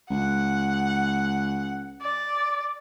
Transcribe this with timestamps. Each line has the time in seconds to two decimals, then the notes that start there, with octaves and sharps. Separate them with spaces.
0.10 C#2 F#5
2.02 D5